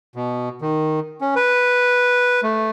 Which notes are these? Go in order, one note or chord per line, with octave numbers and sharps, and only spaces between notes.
B2
D#3
C#4
B4
A3